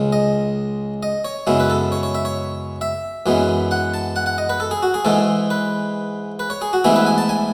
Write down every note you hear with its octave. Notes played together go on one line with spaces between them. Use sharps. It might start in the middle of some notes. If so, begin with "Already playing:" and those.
Already playing: C#2 C#3 G#3
D#5
D#5
C#5
F#2 C#3 G#3 B3 E4
B4
A4
C#5
C#5
E5
C#5
E5
F#2 E3 G#3 B3
F#5
A5
F#5
F#5
D#5
B4
A4
G#4
F#4
G#4
G#2 E3 G#3 A4
B4
B4
C#5
G#4
F#4
A1 G#2 E3 B3 E4 G#4
B4
G#5
A5
G#5